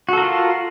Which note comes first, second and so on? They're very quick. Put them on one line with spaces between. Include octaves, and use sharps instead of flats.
F#4 A4 A#4 F4